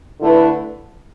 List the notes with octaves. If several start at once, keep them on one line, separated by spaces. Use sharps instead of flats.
D3 A3 E4 B4